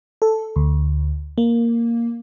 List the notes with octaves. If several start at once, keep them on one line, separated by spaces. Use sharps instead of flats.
A4
D2
A#3